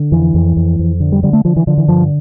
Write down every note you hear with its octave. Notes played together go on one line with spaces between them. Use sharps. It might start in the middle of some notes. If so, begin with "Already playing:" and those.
Already playing: D3
F2 E3
F2
F2
F2
D3
G3
D3 G3
A3
D3 F3
E3
D3 F3
E3
G2 F3